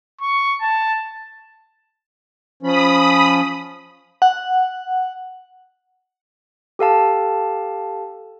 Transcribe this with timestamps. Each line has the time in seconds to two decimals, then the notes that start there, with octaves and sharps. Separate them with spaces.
0.21 C#6
0.61 A5
2.63 F3 C#4 B5 D#6
4.22 F#5
6.79 G4 A4 F5 A5